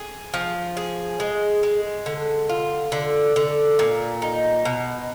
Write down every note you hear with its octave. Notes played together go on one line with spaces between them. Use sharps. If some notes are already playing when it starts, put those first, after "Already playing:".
Already playing: G#4
F3
G#4
G#3
G#3
D3
F4
D3
D3
A#2
D#4
B2